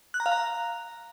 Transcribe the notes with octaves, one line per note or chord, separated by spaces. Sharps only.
F#6
A#5
F5
A#5